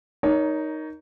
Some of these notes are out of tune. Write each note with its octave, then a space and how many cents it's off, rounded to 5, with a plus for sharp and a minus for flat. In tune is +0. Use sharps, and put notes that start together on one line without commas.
D#4 +0 A#4 +15 C#5 +25